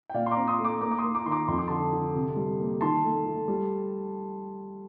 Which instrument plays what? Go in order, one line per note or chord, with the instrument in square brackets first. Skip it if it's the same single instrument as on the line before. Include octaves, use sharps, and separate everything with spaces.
[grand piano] G5
A#2 D5 F5
C6
A#5 D6
C4
C6 D#6
A3
A#5 D6
A#3 A#5 D6
D6
C6 D#6
A#3
A#5 D6
D#3 C6
A#5 D6
F2 C6
D6
D3 A5 C6
D3
C3
G3
A#3
D#3 A5 C6
A3
A3
G3